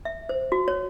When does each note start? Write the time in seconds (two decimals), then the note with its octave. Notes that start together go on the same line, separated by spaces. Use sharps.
0.05 E5
0.29 C5
0.52 F#4
0.68 C#5